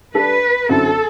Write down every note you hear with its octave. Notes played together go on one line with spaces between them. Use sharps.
G3 D4 A4 B4
F#2 D3 F#3 C4 E4 A4